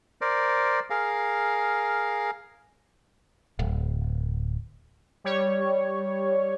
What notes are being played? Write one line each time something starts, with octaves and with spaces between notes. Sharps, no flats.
A#4 C5 D5
G#4 A#4 F5
D1
G3 C#5